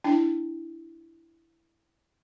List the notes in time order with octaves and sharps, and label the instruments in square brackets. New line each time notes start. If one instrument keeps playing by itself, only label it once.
[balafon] D4 E4 G5